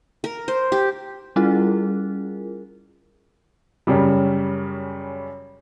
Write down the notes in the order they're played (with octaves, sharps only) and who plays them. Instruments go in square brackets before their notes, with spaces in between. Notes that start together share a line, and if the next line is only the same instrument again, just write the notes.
[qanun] A#4
C5
G4
[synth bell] G3 C#4 E4 F4 G#4 A#4
[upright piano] F#2 C#3 G3